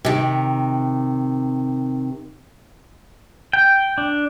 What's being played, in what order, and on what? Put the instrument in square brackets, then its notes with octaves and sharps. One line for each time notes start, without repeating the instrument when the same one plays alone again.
[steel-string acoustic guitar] C3 D#3
[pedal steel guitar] G5
D4